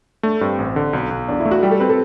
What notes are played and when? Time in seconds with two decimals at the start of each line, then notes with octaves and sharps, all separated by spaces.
0.23 A3 D4
0.41 G2 C4
0.59 A1
0.76 D3
0.93 B1
1.11 B1
1.29 E2 D4
1.40 E4
1.45 A3
1.51 F#4
1.63 G3 G4
1.71 A4
1.80 C4 B4
1.89 A4